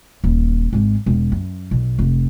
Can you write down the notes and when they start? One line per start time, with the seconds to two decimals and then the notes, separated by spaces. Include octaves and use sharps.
0.24 D#1
0.73 G#1 G#2
1.06 E1
1.32 F#2
1.71 B1
1.99 F1